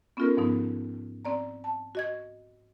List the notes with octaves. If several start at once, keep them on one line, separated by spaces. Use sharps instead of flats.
B3 C#4 D#4 F4 A4 A#4
G#2 F3 B3 D#4
C4 D5 A#5
A5
F#4 D#5 G#6